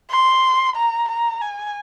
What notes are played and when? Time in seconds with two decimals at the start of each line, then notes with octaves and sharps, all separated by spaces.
0.10 C6
0.76 A#5
1.09 A#5
1.41 G#5